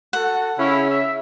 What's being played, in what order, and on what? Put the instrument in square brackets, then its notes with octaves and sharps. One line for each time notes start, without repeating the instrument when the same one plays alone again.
[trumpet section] F#4 A4 [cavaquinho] F#5
[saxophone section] C#3 C#4 [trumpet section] E4
[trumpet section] E5